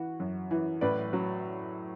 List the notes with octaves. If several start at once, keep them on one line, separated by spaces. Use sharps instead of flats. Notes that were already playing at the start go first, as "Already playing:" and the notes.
Already playing: E3 F#4
F#2
E3
A2 B4 D5
F#3